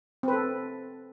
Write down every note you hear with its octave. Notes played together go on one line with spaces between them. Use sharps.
C4 A4 B4